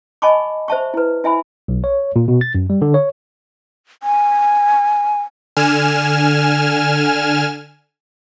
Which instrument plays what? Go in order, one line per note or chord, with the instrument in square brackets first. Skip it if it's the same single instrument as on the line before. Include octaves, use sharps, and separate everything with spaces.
[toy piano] D#5 G#5 A5 B5 C#6 D6
C5 E5 A5 C#6
E4 B4
E4 E5 G#5 B5
[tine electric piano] B1
C#5
A#2
B2
A6
F#2
G3
D3
C#5
[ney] G#5
[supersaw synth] D3 G#5 F6 E7